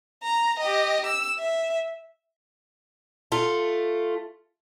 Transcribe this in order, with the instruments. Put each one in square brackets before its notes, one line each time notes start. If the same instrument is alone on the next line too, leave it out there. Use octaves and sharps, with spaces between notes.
[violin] A#5
G4 D#5
E6
E5
[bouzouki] A3 F4